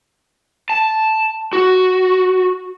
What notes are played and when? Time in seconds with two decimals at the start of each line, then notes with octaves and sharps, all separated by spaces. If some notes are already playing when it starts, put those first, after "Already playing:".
0.70 A5
1.53 F#4